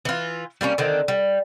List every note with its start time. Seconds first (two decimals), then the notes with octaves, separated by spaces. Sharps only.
0.05 E3 F4
0.61 G3 A#3 B3 C#4
0.78 D3 D#3 C4
1.08 G3